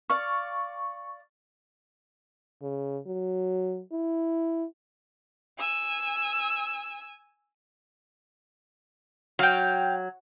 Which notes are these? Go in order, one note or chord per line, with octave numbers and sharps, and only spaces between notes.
D5 F5 C#6
C#3
F#3
E4
G#5 E6
F#3 F5 G5